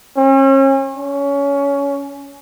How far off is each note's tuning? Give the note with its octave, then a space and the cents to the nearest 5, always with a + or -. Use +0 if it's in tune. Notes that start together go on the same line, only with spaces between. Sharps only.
C#4 -40
C#4 +20